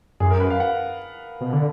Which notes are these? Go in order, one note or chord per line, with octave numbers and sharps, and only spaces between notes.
F#2 G#4
A#4
B4
F5
F#5
B2
D3